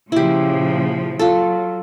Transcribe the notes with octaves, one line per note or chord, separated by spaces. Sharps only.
A#2 C#3 F3 E4 G4
F#3 F4 A4